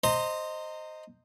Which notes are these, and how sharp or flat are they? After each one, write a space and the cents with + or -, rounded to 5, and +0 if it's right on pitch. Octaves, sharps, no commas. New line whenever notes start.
C5 +0 D#5 +0 A#5 -25